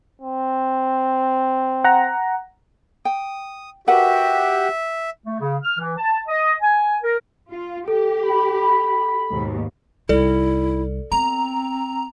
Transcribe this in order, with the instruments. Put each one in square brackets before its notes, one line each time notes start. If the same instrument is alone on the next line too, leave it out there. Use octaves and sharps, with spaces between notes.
[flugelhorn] C4
[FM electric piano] F#5 A#5
[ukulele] G5 [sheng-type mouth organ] D#6
[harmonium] F#4 G4 [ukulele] A#4 B4 F#5 [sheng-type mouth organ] E5
[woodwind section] A3
C#3
F6
E3
A5
D#5
G#5
A#4
[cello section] F4
[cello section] G4 [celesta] A4
[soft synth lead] B5
[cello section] D#2 G#2 B2
[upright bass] C2 D#4 [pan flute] E4 [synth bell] A4 D5
[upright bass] B3 [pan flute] C4 [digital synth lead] A#5